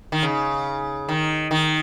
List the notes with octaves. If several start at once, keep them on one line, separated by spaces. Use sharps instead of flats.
D#3
C#3
D#3
D#3